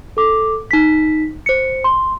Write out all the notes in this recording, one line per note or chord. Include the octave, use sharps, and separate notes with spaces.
A4 D6
D#4 B6
C5 C#7
C6